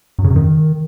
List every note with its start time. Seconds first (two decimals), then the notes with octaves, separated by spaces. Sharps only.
0.19 F#2
0.24 C#3
0.30 F#2
0.36 D#3